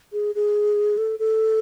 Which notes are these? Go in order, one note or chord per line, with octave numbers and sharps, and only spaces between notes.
G#4
G#4
A4
A4